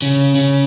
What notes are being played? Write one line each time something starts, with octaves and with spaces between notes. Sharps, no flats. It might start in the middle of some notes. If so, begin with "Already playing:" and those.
C#3
C#3